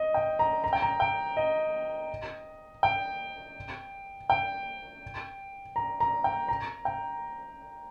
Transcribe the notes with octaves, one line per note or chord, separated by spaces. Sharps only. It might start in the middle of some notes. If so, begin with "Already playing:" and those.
Already playing: D#5
G5
A#5
A#5
G5
A#5
G5
D#5
G5
G5
A#5
A#5
G5
A#5
G5